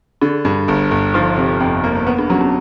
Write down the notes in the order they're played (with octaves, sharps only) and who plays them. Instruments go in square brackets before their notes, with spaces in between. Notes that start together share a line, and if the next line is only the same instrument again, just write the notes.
[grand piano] D3 [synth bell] D4
[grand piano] G2
G1
G1
[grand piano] F3 [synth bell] D#4
[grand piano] C3
F2
A#3
B3
[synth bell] D4
[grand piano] F#3 [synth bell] C#4
[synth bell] C4